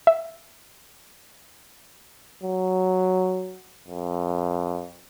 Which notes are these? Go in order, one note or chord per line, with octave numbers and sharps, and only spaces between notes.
E5
F#3
F2